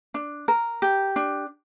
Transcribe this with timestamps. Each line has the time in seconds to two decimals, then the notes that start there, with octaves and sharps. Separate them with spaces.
0.14 D4
0.48 A#4
0.82 G4
1.16 D4